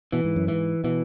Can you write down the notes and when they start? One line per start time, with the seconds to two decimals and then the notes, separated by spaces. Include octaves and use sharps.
0.12 B2 E3
0.24 G#2
0.36 F#2
0.47 G#2 E3
0.84 B2 E3